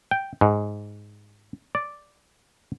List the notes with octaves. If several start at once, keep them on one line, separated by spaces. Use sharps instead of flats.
G5
G#2
D5